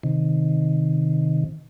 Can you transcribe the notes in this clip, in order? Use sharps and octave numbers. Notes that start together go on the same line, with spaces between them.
C3 D#3